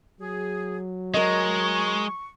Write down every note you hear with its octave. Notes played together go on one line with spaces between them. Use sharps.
F#3 G#4
G#3 A#4 D#5 C#6